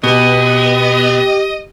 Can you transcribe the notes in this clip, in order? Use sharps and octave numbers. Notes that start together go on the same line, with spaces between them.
B2 B3 G4 D#5